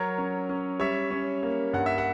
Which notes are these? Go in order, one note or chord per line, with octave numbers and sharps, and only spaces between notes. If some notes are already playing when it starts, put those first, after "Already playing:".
Already playing: F#3 A#4 C#5
C#4
C#4
G3 C#5 E5
C#4
A#3
G2 F#5
E5
F#5